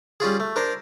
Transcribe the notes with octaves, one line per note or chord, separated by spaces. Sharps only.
G3 C#4 F4 G#4
A3
D4 A#4 C5